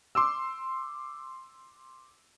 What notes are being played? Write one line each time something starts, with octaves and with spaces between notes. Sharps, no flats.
C6 D6 E6